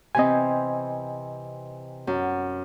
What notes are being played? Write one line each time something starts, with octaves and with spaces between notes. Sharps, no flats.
C3 E3 C4 D#5 G#5
F#2